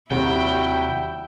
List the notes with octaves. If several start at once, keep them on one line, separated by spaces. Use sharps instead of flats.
D#2 C3 F#3 G3 E4 F#4 G5